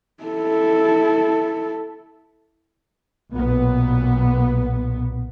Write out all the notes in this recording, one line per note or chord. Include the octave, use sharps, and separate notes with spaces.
E4 A4
B1 A#2 B3